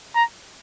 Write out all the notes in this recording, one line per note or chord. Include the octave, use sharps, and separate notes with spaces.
A#5